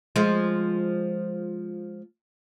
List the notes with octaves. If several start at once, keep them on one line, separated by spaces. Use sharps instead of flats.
F3 G#3